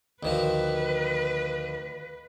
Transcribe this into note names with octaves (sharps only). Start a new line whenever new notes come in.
D2 D#3 F3 B4